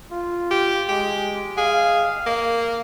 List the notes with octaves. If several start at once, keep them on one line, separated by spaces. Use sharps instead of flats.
F4
G4
G#3 G4
G#4 F5
A#3